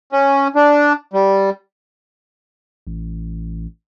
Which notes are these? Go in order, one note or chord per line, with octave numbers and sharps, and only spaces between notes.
C#4
D4
G3
A1